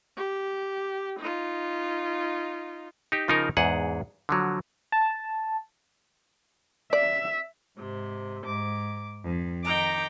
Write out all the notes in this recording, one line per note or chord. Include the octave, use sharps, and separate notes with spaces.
G4
D#4 F4
D#4 G4
C#3 F3 D#4 F4 A#4
E2 G#2 G#4 F#5
D3 F3 F#3
A5
D5 E5
G#2 C3
G#2 D6
F2
D#3 D#4 G5 A#5 D6